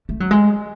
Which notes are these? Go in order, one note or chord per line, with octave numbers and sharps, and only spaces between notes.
A3
F#3
G#3